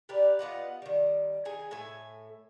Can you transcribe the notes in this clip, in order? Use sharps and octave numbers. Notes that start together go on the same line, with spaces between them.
G4 A#4 B4 D5
B3 F4 D#5 F#5
D#3 G3
D#3 D#4 G#4 G#5
A2 A3 E5 G#5